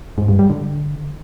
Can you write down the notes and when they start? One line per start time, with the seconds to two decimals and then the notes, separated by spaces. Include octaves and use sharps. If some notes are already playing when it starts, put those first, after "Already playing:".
0.18 G#2
0.28 G2
0.39 G3
0.50 D3